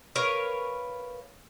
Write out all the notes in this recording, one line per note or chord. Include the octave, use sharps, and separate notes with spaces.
A#4 B4 C#5 F5